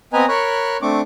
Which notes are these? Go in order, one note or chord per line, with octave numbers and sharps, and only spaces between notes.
B3 C4 B4 D#5 G#5 A#5
A#4 C#5 B5 C#6 F#6
A3 C4 D4 C#6 D6